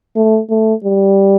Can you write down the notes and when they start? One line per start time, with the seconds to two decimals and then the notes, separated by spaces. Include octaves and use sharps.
0.16 A3
0.50 A3
0.84 G3